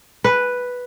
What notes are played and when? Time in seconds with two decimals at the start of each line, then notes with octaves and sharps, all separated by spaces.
0.24 B4